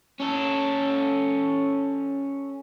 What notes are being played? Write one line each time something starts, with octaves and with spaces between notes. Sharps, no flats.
C#4 A4